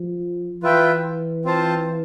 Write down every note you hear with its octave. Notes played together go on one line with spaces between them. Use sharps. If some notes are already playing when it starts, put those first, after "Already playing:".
Already playing: F3
E3 F4 B4 E5 G5
C4 F4 C5 F5 A5